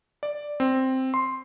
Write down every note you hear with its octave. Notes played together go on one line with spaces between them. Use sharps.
D5
C4
C6